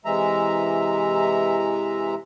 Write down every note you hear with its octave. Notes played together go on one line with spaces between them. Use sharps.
C3 E3 G#3 E5 A#5